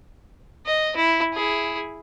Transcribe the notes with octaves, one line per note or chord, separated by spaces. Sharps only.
D#5
E4
E4 G#4